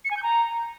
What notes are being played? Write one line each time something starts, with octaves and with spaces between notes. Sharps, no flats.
C#7
G#5
G6
A#5